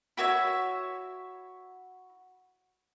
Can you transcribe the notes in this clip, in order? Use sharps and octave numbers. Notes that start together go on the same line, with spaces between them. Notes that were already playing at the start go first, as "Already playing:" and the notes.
E4 F#4 C#5 E5